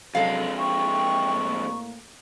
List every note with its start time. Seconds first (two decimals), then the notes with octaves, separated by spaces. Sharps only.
0.15 F2 C3 F#3 G#3 A4 F5
0.59 E5 G5 C#6
1.34 A2 A#3